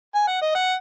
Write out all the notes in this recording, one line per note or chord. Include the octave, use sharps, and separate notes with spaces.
G#5
F#5
D#5
F#5